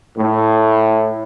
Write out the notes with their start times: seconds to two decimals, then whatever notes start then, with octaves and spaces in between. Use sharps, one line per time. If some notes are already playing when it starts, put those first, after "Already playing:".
0.18 A2